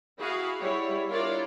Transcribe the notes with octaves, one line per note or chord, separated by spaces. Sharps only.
E4 F#4 G#4 F5
G3 E4 C#5
D4 E4 F4 A#4 C#5 D5